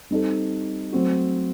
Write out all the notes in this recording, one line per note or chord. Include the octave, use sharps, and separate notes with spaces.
G3 C4 D#4 A4
F#3 A3 C4 F#4